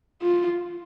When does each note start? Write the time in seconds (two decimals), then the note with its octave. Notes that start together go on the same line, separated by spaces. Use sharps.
0.22 F4